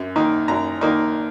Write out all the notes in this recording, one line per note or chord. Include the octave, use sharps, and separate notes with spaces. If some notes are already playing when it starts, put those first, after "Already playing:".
Already playing: F#2
D#3 A#3 D#4
F#2 A#5
D#3 A#3 D#4